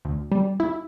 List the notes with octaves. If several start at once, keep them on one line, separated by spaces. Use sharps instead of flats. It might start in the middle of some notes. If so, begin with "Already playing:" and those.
D2
G3
E4